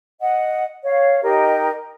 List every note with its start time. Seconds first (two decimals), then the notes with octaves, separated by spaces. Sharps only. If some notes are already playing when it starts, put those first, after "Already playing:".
0.20 D#5 F#5
0.84 C#5 F5
1.22 D#4 G4 A#4 D#5